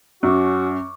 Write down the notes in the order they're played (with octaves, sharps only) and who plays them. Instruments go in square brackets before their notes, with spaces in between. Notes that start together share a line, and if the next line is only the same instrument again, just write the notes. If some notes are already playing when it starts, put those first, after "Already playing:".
[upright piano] F#2 [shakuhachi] C#4 [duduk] F#4 [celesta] C#6 D6